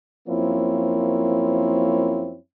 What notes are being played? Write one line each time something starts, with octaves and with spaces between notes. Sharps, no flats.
F#2 F3 A#3 C4 E4 C#5